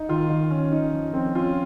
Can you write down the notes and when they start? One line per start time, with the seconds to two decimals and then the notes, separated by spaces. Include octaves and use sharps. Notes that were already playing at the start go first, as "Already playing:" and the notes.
Already playing: D#4
0.09 D#3 F4
0.30 D#3
0.51 C#4
0.72 D#4
0.93 F3
1.14 C4
1.35 C#4 F4